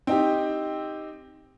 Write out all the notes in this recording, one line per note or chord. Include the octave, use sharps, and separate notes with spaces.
C4 D#4 G4